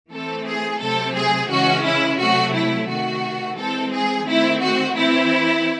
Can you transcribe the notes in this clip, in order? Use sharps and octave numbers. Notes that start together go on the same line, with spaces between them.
E3 A3 C4 A4
G#4
C3 F#3 A3 C4 A4
G#4
C#3 E3 G#3 C#4 F#4
E4
C3 F#3 A3 F#4
E4
C3 D#3 A3 F#4
E3 G#3 C4 A4
G#4
D#3 A3 C4 E4
F#4
E3 C4 E4